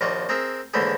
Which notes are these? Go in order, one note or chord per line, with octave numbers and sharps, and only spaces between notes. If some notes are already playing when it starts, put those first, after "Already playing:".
A#1 D#2 F4 F#4 D5
C4 G#4 A#4 E5
D#2 G#2 D3 E3 G4 G#4